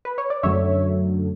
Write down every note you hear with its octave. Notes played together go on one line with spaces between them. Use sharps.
B4
C#5
D5
F#2 D3 F#3 A3 C#5 E5